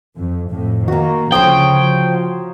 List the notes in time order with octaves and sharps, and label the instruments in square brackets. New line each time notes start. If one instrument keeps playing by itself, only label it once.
[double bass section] F2
F2 A2
[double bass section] D#3 A#3 [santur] F#4 A#5
[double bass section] D2 C#3 F3 [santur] C5 C#5 D#6 [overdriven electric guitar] G5
[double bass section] F3